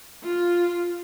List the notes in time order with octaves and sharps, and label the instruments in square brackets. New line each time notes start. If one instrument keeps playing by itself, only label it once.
[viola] F4